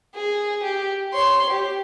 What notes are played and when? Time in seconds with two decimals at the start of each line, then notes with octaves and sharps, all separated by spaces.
0.15 G#4
0.63 G4
1.13 C#5 C6
1.49 G4